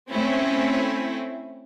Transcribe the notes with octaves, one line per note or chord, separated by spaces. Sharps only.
A3 C4 C#4 E4